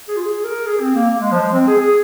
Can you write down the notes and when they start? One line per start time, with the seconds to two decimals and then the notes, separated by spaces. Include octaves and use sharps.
0.08 G#4
0.16 F4
0.22 G#4
0.45 A#4
0.67 G#4
0.81 C4
0.95 A#3
1.10 A#3
1.21 G#3
1.32 F3
1.42 G#3
1.53 C4
1.68 G#4
1.82 G#4